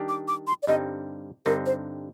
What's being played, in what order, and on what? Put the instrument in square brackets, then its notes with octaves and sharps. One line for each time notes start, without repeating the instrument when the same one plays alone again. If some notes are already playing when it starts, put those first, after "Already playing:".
Already playing: [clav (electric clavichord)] D#3 G3 D4 G4 D5
[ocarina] D6
D6
C6
D5
[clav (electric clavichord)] G2 D3 G3 C4 D#4 [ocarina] D#5
[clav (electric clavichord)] G2 D3 G3 C4 D#4 [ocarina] A#4
[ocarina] C5